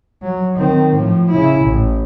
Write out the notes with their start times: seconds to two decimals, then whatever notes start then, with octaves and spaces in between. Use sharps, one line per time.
0.22 F#3
0.56 D#3 C4
0.94 A2 F3
1.29 C#3 E4
1.64 A1